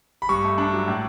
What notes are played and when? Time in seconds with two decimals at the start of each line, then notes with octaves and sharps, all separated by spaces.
0.22 B5
0.29 G2 C#6
0.44 A3
0.58 D4
0.73 F#3
0.88 A2